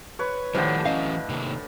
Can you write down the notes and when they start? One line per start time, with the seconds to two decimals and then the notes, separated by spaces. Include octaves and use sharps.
0.19 B4 C#5
0.55 A2 D3 D#3 F3 G3 D4 C5 G5
0.86 E3 F#3 C#4 D#5 F5
1.29 C3 D#3 A#3